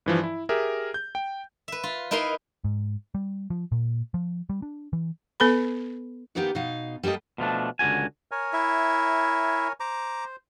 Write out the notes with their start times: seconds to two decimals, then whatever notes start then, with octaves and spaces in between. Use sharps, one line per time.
0.06 G2 E3 F3
0.23 E4
0.49 G4 G#4 A#4 E5
0.94 G6
1.15 G5
1.68 B4 E5
1.83 F4
2.11 D#4 E4 A#4 B4 A#5 C6
2.64 G#2
3.15 G3
3.50 F3
3.72 A#2
4.14 F3
4.50 G3
4.62 D4
4.93 E3
5.40 B3 A4 B4 B5
6.35 D#3 A#3 B3 D#4 G4
6.55 B2 D#4 F5
7.03 G3 A#3 G4 A4 D#5
7.38 B2 F3 A3 D4
7.79 C#2 D3 F#4 G#5
8.31 A#4 C#5 G#5
8.53 E4 E5
9.80 C5 A#5 D6